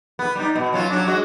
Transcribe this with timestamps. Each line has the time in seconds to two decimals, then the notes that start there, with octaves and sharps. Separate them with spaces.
0.19 B3
0.35 G3 D#4
0.55 B2
0.73 F#3 C#4 F4
0.90 F#3 C#4 D4
1.07 G#3 F#4